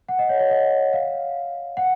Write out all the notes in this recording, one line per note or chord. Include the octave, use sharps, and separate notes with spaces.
F#5
D#5
C#5
C#5
D#5
F5
F#5